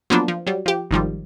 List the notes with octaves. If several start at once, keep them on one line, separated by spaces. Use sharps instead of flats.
F3 F#3 A#3 B3 D4 F4
F3
F#3 G3
F3 G4
G#1 D#3 F3 G3